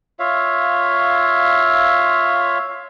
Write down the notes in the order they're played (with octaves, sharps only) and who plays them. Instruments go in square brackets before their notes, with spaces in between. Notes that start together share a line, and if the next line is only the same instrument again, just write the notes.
[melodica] F4 C#5 E5 F5